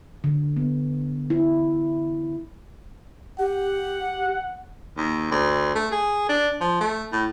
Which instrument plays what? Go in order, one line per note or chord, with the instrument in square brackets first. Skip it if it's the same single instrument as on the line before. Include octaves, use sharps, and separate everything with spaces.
[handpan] D3
B3
E4
[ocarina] G4 [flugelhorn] F#5
[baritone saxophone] D#2
D2
A3
G#4
D4
F3
A3
A2